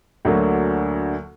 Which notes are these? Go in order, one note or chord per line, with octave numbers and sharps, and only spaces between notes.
D2 D3 F#3 A#3